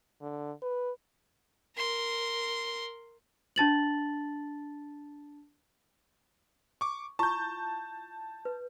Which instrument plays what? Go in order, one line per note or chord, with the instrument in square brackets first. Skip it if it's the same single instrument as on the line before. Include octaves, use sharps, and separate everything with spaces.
[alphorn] D3
B4
[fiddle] A#4 C6
[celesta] D4 A5 A6 F#7
[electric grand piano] C#6 D6
[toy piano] E4 F4 C#6 [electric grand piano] A5 G6
[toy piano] B4